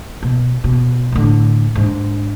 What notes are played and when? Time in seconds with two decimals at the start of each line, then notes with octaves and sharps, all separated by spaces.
0.23 B2
0.64 B2
1.12 A2 D3
1.75 G#2 D4